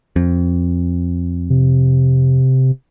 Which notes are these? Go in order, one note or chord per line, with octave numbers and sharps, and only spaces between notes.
F2
C3